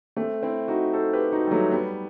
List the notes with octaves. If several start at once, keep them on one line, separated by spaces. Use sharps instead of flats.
A3 C4
C4 E4
D#4 F#4
A4 C5
G4 B4
D#4 F#4
G3
F#3 A3
G3 B3